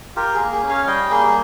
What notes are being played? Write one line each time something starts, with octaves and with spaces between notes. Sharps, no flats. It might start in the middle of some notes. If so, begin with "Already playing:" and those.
F4 G4 A#4
G#4
A#3
G#4
C#4
C#5 F5
G3 D#5 G5
A#3 G#4